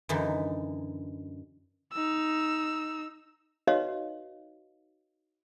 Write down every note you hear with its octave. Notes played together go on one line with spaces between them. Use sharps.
F#2 D3 E3 D#4
D#4 E6
D#4 F#4 B4 C#5 D#5 F5